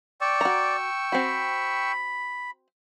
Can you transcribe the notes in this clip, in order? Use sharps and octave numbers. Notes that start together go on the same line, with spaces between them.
D5 G5 C#6 E6
F#4 A#5
C4 F#4 B5